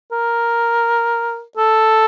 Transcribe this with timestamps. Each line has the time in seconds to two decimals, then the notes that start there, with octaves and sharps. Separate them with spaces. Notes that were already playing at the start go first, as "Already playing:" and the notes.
0.12 A#4
1.57 A4